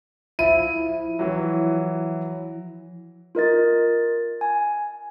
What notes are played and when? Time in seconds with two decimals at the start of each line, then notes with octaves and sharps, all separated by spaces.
0.39 F3 E4 D#7
1.19 E3 F#3
3.35 F4 A#4 D#5 A6
4.41 G#5